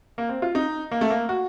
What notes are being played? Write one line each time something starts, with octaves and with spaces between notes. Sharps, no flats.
A#3
C4
F4
D#4
A#3
A3
A#3
F#4